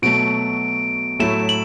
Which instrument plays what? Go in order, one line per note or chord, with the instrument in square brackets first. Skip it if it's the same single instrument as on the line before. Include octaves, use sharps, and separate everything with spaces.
[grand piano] B2 F#3 A3 [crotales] D7
[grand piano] A2 F#3 A3 E4 [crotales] E7
[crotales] F#7